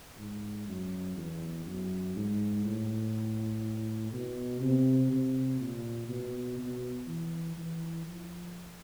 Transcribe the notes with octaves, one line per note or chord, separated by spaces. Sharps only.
G#2
F#2
E2
F#2
G#2
A2
B2
C3
C3
A#2
B2
B2
E3
E3
F3